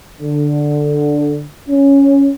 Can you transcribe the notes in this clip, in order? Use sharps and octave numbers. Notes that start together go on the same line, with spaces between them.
D3
C#4